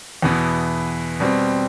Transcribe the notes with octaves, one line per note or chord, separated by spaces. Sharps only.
E2 B2 B3 E4
B2 G3 C4